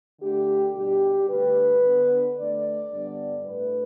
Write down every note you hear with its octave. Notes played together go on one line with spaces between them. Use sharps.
D3 A3 D4 G4
B2 G3 D4 G4
G2 D3 A3 B4
D3 B3 D4
D3 A3 D4 D5
G2 D3 G3 B3 D4
A2 A3 D4 B4